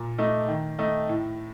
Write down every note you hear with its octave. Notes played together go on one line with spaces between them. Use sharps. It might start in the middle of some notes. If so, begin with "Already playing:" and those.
Already playing: A#2
A3 D#4
D#3
A3 D#4
A2